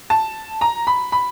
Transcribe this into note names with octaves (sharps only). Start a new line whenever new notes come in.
A5
A#5
B5
B5